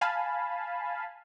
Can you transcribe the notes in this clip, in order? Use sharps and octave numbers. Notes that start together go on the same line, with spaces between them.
F5 G#5 A5 B5